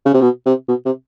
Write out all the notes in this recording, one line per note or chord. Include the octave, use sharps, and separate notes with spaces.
C#3
C3
B2
C3
B2
C3